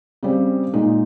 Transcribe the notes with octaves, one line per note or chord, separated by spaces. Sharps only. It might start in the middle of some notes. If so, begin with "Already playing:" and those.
C#3 G3 C4
A#2 G#3 D#4